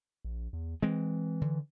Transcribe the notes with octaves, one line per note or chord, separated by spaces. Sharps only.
A#1
E2
E3 G#3 C4
D3